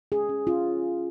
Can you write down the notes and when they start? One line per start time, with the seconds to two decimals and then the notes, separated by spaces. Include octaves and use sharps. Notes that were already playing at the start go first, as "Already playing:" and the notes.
0.12 C#4 G#4
0.29 C#4
0.47 C#4 F4